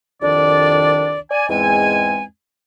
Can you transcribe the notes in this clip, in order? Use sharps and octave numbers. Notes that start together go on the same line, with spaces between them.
C2 F2 D#3 D4 D5
D5 G#5
E2 G#2 G#3 C4 G#5